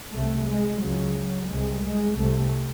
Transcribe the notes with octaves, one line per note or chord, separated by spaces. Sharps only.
C2 C3 A3
G#3
C#2 C#3 F#3
F#3
C2 C3 G#3
G#3
C2 C3 A3